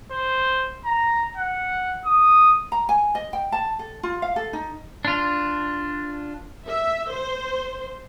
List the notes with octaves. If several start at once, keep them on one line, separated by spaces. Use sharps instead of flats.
C5
A#5
F#5
D#6
A#5
G#5
D#5
G5
A5
A4
F4
F5
A4
D#4
D4 F4
E5
C5